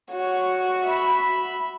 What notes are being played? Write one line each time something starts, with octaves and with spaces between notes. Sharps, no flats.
F#4 C#5
E5 B5